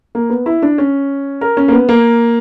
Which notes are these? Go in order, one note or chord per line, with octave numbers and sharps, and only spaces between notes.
A#3
B3
E4
D4
C#4
A#4
C#4
A#3
B3
A#3